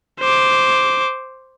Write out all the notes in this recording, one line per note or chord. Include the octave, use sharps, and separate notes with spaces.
C5 D6